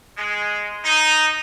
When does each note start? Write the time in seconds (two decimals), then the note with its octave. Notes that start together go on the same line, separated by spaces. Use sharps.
0.18 G#3
0.84 D#4